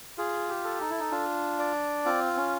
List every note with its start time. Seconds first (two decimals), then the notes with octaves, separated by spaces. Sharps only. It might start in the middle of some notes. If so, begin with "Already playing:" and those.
0.18 F4 G#4
0.49 G4
0.64 A4
0.81 D#4
0.90 E4
1.00 D#4
1.11 D4 F4
1.59 D5
2.05 C4 F4
2.37 C#4